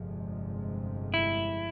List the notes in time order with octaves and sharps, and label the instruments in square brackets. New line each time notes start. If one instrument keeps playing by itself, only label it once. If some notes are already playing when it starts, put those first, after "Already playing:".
Already playing: [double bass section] G1 F2 C3 F3 G#3
[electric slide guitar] E4